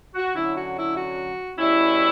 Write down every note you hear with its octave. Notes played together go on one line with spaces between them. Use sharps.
F#4
D3 F#3 C#4 E4
F#4
E4
F#4
B2 G3 C#4 E4